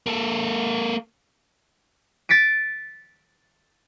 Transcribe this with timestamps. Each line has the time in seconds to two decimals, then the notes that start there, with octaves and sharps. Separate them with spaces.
0.06 A#3 A4
2.29 A6 B6 C#7 D7